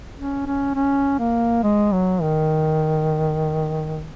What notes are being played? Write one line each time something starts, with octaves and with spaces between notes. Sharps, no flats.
C#4
C#4
C#4
A#3
G#3
F#3
D#3